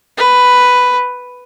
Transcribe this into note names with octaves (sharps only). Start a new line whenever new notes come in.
B4